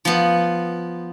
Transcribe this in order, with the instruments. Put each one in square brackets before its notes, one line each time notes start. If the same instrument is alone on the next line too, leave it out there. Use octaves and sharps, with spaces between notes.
[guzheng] F3 B3